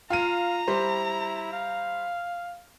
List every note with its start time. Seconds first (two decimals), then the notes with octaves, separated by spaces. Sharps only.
0.10 F4 F5 A#5 D#7
0.68 G3 E4 C5
1.53 F5